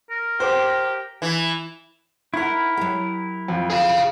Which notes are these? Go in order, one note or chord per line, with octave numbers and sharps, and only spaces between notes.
A#4
G4 C5
E3
D#4 E4 A#4 F#5
F#3 G4
F2
G#4 F5